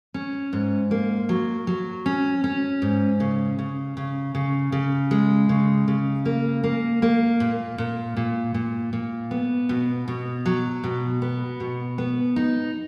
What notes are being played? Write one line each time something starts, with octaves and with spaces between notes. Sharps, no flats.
C#4
G#2
A#3
F#3
F#3
C#4
C#4
G#2
C#3
C#3
C#3
C#3
C#3
G#3
C#3
C#3
A#3
A#3
A#3
A#2
A#2
A#2
A#2
A#2
B3
B2
B2
F#3
B2
B3
B2
B3
D#4